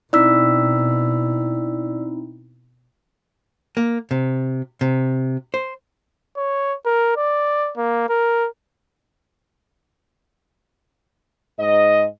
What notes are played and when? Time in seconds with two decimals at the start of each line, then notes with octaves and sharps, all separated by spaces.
0.13 B2 C4 D#4 E4 D5 E6 B6
3.77 A#3
4.11 C3
4.81 C3
5.54 C5
6.37 C#5
6.85 A#4
7.16 D5
7.77 A#3
8.09 A#4
11.59 G#2 D#5